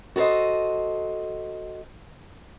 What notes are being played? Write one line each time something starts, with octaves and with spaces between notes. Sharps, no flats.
F#4 A4 A#4 C5 D#5